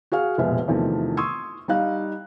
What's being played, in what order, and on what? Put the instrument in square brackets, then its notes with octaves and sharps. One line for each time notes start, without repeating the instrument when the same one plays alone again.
[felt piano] F#4 G#4 F5 F6
F1 A#1 B2 G#3 E5
E2 C3 D#3 F3 A3
C6 C#6 D#6 E6 G#6
G3 D#4 F5 F#6